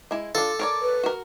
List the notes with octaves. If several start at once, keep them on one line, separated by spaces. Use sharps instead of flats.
G#3 E4
D4 F4 A4
A#4 C#5 D5
B4
F#4 A#4